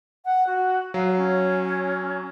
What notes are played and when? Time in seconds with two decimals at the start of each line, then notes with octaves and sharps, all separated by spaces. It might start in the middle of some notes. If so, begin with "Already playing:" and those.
0.25 F#5
0.47 F#4
0.94 F#3 F5
1.17 C#4